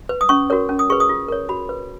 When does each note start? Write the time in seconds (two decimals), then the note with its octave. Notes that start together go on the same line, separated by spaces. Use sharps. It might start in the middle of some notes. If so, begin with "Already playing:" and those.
0.09 B4
0.21 D#6
0.29 C#4 C#6
0.50 F#4 A#4 C#5
0.69 C#4
0.79 D#6
0.90 G#4 B4 C#6
1.00 D#6
1.09 F4
1.28 A#4 C#5
1.49 F#4 B5
1.69 B4